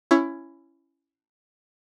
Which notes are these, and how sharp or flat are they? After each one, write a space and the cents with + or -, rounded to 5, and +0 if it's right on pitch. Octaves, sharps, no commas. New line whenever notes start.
C#4 +0 E4 +15 C#5 +0